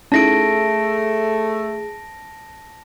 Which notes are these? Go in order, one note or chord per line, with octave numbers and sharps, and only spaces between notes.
A3 C#4 D#4 E4 G#4 A5 A#6 D7